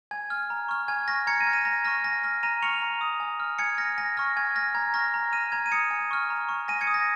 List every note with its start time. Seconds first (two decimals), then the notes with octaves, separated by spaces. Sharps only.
0.11 G#5 G#6
0.30 F6
0.50 A#5
0.69 C#6 F6
0.88 G#5 G#6
1.08 C#6 F6 A#6
1.27 A#5 G#6 C#7
1.41 A#6 D#7
1.47 F6
1.53 A#6 D#7
1.65 A#5 A#6
1.85 C#6 F6 A#6
2.04 G#5 A#6
2.23 F6 A#6
2.43 A#5 A#6 D#7
2.62 C#6 F6 C#7 F7
2.82 A#5
3.01 D#6
3.20 G#5
3.40 F6
3.59 G#5 G#6 C#7
3.78 F6 A#6
3.98 G#5 A#6
4.17 C#6 F6 A#6
4.36 G#5 G#6
4.55 F6 A#6
4.75 A#5 G#6
4.94 C#6 F6 A#6
5.14 A#5
5.33 F6 A#6 D#7
5.52 A#5 G#6
5.66 D#7
5.71 D#6 G#6 C#7
5.91 G#5
6.11 C#6 F6
6.30 A#5
6.49 C#6 F6
6.68 G#5 A#6 D#7
6.81 G#6 C#7
6.87 D#6
6.94 A#6